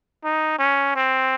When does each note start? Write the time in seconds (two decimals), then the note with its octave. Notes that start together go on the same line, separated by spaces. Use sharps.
0.24 D#4
0.59 C#4
0.95 C4